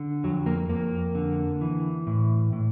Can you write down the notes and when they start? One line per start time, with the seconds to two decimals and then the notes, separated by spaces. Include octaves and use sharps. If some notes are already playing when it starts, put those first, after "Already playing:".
Already playing: D3
0.24 F2 F#3
0.46 A#3
0.69 F2 A#3
1.15 D3
1.61 E3
2.07 A2
2.53 A2